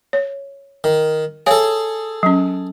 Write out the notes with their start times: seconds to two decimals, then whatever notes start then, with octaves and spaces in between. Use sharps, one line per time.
0.13 C#5
0.84 D#3
1.47 G#4 A4 C#5 F5 G#5
2.23 F#3 C#4